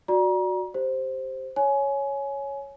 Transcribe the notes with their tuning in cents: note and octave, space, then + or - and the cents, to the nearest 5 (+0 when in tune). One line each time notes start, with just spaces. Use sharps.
F#4 -10 D5 +0 A#5 +35
G4 +0 C5 +0
C#5 +0 G#5 +20